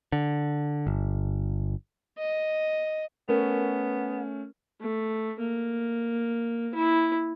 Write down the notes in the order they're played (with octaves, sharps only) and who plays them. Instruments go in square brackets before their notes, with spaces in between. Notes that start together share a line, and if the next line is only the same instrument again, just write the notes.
[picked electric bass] D3
G1
[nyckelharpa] D#5
[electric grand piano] A3 C#4 [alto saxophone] B3 [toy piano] A#4
[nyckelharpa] A3
A#3
E4